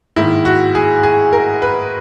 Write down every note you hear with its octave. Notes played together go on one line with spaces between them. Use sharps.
G#2 D#3 A#3 E4
F#4
G#4
G#4
A#4
B4